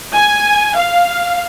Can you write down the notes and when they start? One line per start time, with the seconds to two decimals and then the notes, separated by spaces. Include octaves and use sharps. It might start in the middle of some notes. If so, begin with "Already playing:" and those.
0.15 G#5
0.76 F5